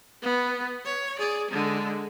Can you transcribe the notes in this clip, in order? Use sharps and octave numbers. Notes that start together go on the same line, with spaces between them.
B3
C#5
G#4 D5
D3 G#3